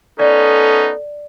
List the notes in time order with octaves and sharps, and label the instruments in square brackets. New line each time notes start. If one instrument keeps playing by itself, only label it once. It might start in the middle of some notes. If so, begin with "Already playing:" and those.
[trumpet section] B3 C#4 D#4 [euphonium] A4 [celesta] D5